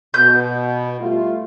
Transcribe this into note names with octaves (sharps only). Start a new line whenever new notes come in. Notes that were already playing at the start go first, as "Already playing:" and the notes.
B2 G6
G3 A3 F4